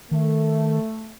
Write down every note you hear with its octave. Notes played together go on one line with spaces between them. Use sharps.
D#3 A3